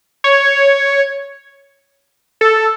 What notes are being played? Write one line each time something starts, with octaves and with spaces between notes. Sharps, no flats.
C#5
A4